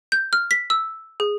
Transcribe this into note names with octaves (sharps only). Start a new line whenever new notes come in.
G6
F6
B6
E6
G#4